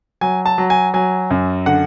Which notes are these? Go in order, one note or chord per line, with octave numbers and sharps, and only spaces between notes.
F#3 G#5
A5
F#3
G#5
F#3 G#5
F#2
D3 F#5